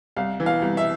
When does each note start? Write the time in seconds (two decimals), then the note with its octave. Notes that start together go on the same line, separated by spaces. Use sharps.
0.16 C2 F5
0.40 E3
0.46 F5
0.62 C2
0.77 E5